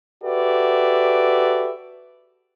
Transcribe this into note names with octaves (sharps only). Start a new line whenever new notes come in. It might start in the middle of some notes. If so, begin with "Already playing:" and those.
F#4 G4 A4 B4 D5 E5